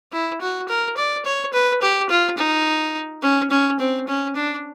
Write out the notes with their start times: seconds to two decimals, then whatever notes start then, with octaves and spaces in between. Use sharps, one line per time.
0.12 E4
0.41 F#4
0.68 A#4
0.97 D5
1.25 C#5
1.53 B4
1.82 G4
2.09 F4
2.38 D#4
3.22 C#4
3.50 C#4
3.79 C4
4.08 C#4
4.35 D4